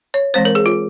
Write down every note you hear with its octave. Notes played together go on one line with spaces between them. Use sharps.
C#5
E3 G#3 C4 C5
A#4
G#4
F4